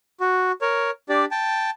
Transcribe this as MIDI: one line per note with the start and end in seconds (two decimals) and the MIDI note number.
0.20 0.52 66
0.62 0.90 70
0.62 0.90 73
1.09 1.25 62
1.09 1.25 67
1.09 1.25 74
1.31 1.70 79
1.31 1.70 81